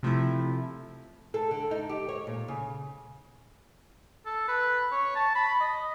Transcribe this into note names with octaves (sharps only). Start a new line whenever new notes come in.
C3 F3 A3 E4
A4
D3
D#4
G4
C#5
A#2
C#3
A4
B4
C#5
A5
B5
D#5